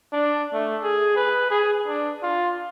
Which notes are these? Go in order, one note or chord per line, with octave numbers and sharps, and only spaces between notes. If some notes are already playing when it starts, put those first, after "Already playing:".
D4
A3
G#4
B4
G#4
D4
F4